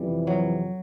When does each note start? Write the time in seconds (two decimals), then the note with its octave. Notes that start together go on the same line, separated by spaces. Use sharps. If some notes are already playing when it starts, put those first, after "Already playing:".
Already playing: F2 C3 E3 G3
0.27 F#3